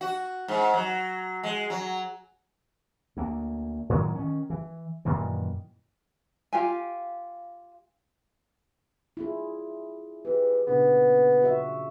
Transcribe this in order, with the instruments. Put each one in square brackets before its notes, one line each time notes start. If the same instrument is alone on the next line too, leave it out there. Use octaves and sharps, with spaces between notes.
[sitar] F#4
G#2
F#3
G#3
F#3
[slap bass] D2 A#3
A2 D#3 F#3 G#3
D#3 C#4
E3
F#2 A#2 D#3 E3
[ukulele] F4 G4 G#5
[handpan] E4 F4 G#4
[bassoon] E3 [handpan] G4 G#4
[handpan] A#2 C#3 D4 [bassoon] B3
[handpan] F4 F#4 E5